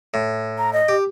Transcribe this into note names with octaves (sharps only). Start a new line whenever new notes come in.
A2
A#5
D#5
G4